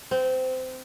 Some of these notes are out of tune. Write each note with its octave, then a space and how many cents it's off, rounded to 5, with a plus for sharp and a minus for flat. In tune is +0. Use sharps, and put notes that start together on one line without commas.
C4 -20